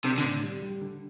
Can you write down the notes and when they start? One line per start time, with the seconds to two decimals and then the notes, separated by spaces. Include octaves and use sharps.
0.05 C3 D4
0.18 D3
0.24 A2
0.43 G3
0.62 G3
0.82 D3